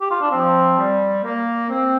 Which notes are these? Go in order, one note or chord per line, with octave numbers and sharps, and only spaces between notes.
G4
F4
D4
F3 C4
G3
A#3
C4